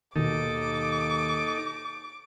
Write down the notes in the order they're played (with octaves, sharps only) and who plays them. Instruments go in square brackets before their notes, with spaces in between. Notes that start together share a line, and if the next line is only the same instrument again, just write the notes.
[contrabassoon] D#2 [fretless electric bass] B2 D#3 [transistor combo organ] D#4 A4 [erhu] D6